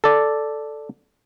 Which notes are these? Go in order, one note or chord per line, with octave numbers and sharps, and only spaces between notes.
A4 D5